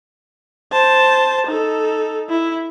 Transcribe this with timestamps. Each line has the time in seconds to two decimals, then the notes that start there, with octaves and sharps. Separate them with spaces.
0.72 C5 A5
1.47 D#4 A4
2.29 E4